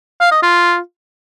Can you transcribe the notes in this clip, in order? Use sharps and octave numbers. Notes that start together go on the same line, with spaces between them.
F5
D#5
F4